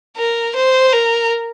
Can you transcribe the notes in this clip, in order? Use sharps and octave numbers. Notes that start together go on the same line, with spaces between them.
A#4
C5
A#4